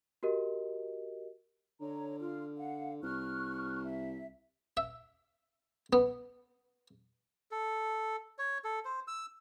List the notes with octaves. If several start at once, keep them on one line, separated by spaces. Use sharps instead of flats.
F#4 G4 A#4 D#5
D3 C#5 A#5
F4 F6
F5 F#5
C2 C#6 F6 F#6
E5
E5
B3
A4
C#5
A4
C5
E6